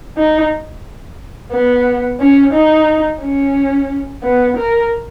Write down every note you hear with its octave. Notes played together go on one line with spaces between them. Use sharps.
D#4
B3
C#4
D#4
C#4
B3
A#4